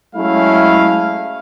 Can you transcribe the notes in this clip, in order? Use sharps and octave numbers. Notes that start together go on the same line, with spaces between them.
F#3 G#3 A3 C#4 E4 F5